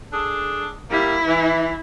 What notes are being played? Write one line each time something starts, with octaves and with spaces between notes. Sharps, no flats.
D4 G#4 A4
G3 A#3 E4
E3